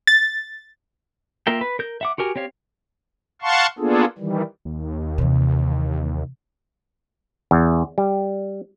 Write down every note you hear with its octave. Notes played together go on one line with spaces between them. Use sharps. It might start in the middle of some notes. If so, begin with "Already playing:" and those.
A6
A#3 F4 A#4 E5 G5
B4
A#4 G6
E5 F#5 D6
F#4 G4 A#4 G#5
C4 G4 C#5 F5
F5 F#5 A5 C6 C#6
A#3 B3 D4 F4 G#4 A4
D#3 E3 G3
D#2
C3 E3
E2
G3